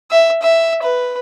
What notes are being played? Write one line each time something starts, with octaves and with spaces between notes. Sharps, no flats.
E5
E5
B4